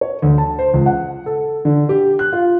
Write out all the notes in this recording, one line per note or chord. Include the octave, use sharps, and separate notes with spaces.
C#5
D2
A5
C5
C#2
F#5
A4
D3
G4
F#6
F4